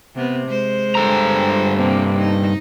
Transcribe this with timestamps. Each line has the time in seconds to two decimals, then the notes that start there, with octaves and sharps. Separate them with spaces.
0.15 C3 B3
0.47 G#3 C5
0.95 G2 A4 A#5
1.77 C3 A#3 C4
2.18 D#4